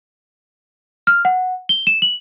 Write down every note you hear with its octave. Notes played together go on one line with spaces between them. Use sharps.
F6
F#5
G7
E7
F#7